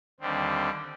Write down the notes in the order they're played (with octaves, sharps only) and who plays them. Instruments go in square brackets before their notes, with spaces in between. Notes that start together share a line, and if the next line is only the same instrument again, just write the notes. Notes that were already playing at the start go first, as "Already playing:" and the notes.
[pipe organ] D#2 D3 G3 C4